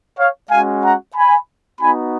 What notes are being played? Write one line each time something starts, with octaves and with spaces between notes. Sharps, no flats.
C#5 F5
G#3 C#4 F#4 F5 G#5
F#5 A#5
G#5 B5
B3 D#4 F#4 G#5 B5